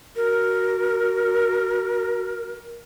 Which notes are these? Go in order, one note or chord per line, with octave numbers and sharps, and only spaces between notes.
F#4 A#4